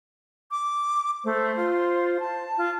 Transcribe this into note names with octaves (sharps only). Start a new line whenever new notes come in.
D6
A3 C5
F4
A5
F4